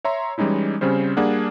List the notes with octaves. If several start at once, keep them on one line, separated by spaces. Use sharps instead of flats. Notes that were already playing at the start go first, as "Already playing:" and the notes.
C#5 E5 A#5 C6
E3 G3 G#3 C#4 D#4 E4
C#3 G3 C4 C#4 C5
G3 A#3 D4 G#4 F#5